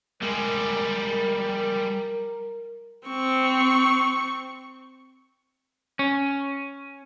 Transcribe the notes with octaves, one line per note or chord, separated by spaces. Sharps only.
G3 G#3 A#4
C4 C#6
C#4